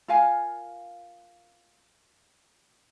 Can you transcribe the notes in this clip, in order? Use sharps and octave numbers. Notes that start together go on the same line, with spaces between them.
F4 A#4 F5 G#5